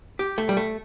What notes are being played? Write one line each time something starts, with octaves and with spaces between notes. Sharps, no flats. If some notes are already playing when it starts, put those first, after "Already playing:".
G4
A3
G3
A3